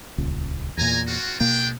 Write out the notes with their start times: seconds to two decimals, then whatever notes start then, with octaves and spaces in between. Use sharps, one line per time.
0.18 D#1 C#2
0.77 E2 A#2 G#5 A#5
1.07 C4 F4 F#4
1.40 B2 G#3 A#3 D4 G5